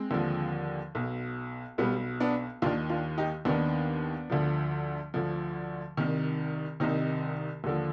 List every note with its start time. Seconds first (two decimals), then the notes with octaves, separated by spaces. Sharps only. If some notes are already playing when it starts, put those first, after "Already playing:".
Already playing: G#3 C4
0.11 D#2 D3 F3
0.95 B1 B2
1.78 B1 B2 G3 B3
2.20 B3 D4
2.62 D#2 D4 F4
2.66 D#3
2.89 D4 F4
3.18 D#4 G4
3.45 D#2 D#3 B3 D4
4.30 D2 D3 F3
5.14 D2 D3 F3
5.97 C2 C3 D#3
6.80 C2 C3 D#3 C4 D#4
7.64 D#2 D3 F3